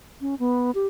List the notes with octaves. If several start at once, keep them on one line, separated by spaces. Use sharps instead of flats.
C#4
B3
G4